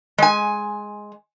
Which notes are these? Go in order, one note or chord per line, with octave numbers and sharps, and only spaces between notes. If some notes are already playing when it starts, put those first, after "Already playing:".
G#3 G#5